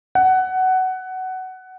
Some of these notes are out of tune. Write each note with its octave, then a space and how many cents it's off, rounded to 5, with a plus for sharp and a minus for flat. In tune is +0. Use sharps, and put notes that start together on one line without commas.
F#5 +15